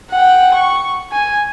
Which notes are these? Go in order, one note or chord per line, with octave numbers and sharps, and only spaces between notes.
F#5 G5
C#6
G#5